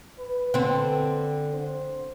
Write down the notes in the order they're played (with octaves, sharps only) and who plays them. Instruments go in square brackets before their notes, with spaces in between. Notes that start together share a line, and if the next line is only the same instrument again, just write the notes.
[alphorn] B4
[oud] D3 C4
[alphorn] C5